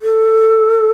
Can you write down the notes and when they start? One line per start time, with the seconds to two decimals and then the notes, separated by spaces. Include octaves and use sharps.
0.02 A4